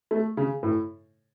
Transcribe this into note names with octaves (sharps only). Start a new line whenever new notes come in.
A3
C#3
A2